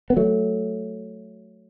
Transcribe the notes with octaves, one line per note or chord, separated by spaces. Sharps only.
B3
F#3 A3